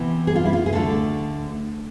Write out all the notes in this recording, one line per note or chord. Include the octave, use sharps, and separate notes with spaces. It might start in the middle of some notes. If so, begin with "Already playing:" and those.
Already playing: C3 E3 B3
G#4
F4
E4
F4
G#4
D2 D3 A3 A4